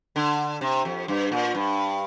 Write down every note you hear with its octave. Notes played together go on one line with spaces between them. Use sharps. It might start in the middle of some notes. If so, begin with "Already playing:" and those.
D3
C3
F2
G2
A#2
G2